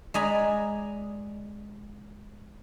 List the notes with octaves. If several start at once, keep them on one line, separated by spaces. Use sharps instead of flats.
G#3 D5 D#5 G#5 A#5 B5